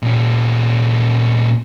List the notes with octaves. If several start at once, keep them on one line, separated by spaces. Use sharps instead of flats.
A#2 C#4